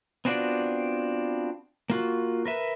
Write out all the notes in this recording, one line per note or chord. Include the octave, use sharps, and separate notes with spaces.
B3 C4 D4 F4 F#4 D5
A#3 F4 F#4
A#4 B4 E5